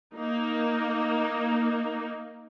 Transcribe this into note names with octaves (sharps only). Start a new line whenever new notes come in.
A#3 D#4